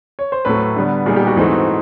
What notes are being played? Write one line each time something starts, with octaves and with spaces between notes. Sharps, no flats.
C#5
C5
A2 F#3 A3 B4
D3 G3 B3
A#2 G3 B3 D#4 G#4
G4
F#4
G#2 E3 A3 C4 D#4